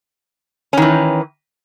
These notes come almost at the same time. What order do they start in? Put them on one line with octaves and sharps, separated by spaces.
C#4 D#3 E3